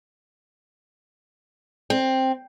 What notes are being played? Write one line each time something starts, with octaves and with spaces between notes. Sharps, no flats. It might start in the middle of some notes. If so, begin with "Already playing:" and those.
C4